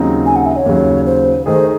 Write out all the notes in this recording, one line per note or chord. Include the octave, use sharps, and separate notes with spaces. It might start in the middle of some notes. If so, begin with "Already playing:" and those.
Already playing: D#2 C#3 F#3 C4 D#4
G#5
F#5
E5
C#5
D#2 C#3 F#3
C5
D#3 A3 D#4 G#4 C5